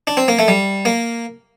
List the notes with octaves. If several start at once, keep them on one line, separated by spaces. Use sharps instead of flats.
D4
C4
A#3
A3
G3
A#3